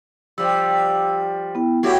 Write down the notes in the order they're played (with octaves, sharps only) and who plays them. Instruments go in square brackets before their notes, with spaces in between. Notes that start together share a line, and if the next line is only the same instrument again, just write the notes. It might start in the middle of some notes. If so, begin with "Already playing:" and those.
[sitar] F3 G3 [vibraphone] E6
[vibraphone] B3 E4 G5
[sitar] A3 E4 G4 [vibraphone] F#4 C#5 F#5